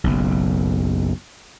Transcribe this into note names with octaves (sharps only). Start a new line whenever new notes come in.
F#1 B1